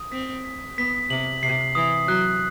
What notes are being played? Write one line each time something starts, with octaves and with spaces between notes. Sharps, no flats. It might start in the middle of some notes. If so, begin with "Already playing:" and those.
Already playing: D#6
C4 B6
B6
B3 B6
C3 F#7
C3 C7
E3 D#6
F#3 F#6